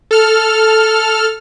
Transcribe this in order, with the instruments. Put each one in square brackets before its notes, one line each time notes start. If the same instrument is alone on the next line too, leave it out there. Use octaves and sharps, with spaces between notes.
[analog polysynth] A4 F6